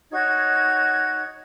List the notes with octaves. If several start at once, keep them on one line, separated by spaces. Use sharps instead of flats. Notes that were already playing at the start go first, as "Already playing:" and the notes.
D#4 F#4 C#5 G#6